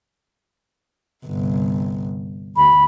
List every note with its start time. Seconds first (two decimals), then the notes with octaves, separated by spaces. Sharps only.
1.25 G1 C2
2.57 D2 B5